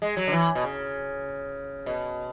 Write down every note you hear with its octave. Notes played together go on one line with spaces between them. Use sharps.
G#3
F#3
D3
E3
B2
C#3
B2